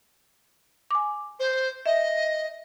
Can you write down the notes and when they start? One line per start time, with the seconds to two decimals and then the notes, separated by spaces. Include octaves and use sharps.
0.91 G#5 D6
1.39 C5
1.86 D#5 E5